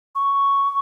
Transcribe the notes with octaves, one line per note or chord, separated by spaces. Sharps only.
C#6